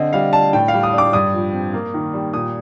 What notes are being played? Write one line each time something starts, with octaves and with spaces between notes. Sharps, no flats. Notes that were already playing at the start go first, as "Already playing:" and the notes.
Already playing: D3 C4 D#5
G3 F5
D4 A5
A2 G5
F5
G3
D#6
D4 D6
G2 D#6
F3
C4
A#3
D#3
G3
A#2 D#6